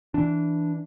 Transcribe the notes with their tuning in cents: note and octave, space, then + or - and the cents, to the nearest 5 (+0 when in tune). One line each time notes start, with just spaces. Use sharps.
E3 +0 D4 +0